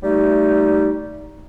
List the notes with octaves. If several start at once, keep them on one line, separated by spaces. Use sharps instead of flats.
G3 A3 D#4